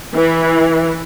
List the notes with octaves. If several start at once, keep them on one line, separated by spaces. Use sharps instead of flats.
E3